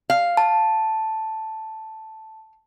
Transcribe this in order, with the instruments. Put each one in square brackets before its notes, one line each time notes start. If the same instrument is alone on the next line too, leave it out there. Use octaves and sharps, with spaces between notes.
[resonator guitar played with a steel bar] F5
[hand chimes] A5